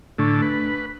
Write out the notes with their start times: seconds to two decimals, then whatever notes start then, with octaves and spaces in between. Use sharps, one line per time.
0.18 A2 D3 A3 D4 C#6
0.42 B4